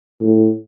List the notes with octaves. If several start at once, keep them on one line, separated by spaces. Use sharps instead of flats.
A2